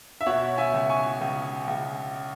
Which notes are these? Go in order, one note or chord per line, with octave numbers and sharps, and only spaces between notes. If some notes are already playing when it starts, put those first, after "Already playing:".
E5
B2 C#5 F#5
E5 G#5
C#2
G#5 C#6
C#2
C#2